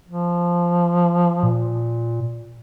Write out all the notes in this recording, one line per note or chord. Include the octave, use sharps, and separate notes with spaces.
F3
A#2